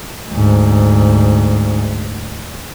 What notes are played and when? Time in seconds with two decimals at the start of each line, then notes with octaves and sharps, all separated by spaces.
0.30 D2 G#2